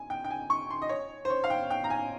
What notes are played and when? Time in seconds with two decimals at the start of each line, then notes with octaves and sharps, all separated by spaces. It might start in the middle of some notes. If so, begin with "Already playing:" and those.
Already playing: G#5
0.10 G5
0.25 G5
0.31 G#5
0.50 C#6
0.70 C6
0.82 D#5
0.89 C#5
1.25 C5
1.30 C#5
1.44 F5
1.50 G5
1.71 G5
1.84 A#5
1.90 G#5